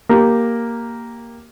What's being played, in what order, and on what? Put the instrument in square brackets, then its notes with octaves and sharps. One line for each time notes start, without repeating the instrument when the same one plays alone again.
[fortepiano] A#3 G4